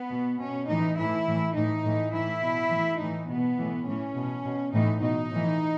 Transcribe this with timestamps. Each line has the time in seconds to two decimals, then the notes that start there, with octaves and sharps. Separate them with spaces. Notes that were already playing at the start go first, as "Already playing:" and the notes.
Already playing: B3
0.10 B2
0.39 B2 C#4
0.68 A2 E3 D#4
0.97 A2 E3 E4
1.26 A2 E3
1.55 A2 E3 D#4
1.84 A2 E3
2.12 A2 E3 E4
2.42 B2
2.70 A2 E3
3.00 A2 E3 D#4
3.28 B2 B3
3.58 A2 E3
3.87 A2 E3 C#4
4.15 B2
4.44 B2
4.73 A2 E3 D#4
5.02 B2 D#4
5.31 A2
5.36 E3